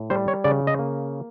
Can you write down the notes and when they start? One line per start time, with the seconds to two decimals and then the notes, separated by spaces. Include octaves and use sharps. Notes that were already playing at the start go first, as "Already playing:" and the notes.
Already playing: A2
0.10 G3 C5
0.28 C#5
0.44 C#3 D5
0.67 D#5
0.79 A#3